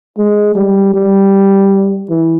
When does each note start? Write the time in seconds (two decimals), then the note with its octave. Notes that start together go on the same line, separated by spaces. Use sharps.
0.18 G#3
0.55 G3
0.94 G3
2.09 E3